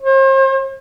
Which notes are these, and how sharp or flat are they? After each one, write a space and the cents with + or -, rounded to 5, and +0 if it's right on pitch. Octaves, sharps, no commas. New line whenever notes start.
C5 +40